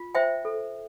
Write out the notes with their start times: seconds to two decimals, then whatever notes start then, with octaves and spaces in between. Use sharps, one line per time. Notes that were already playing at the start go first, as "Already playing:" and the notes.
Already playing: F4
0.15 C5 E5 G5
0.45 A4